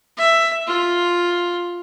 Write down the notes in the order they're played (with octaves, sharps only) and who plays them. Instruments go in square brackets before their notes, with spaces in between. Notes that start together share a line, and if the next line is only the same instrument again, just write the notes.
[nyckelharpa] E5
F4